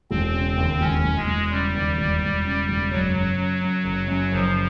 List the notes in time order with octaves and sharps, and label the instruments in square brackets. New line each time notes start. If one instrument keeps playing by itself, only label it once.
[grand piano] E1 [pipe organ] C4
[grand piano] C#3
D#2
[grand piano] E1 [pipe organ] C#4
[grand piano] E1
[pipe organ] G#3
[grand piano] E1
[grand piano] C#3 [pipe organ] G3
[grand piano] D#2
E1
E1
C#3
E1
[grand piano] F#1 [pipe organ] F#3
[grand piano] C#3
F#2
F#2
F#1
F#2
[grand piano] F#1 [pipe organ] F3